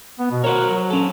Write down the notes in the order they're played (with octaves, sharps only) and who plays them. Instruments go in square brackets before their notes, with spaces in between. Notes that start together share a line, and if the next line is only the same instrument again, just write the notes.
[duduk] B3
B2
[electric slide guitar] F#4 C5 C#5 [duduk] A#4
[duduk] F#3
[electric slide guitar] C#4 A4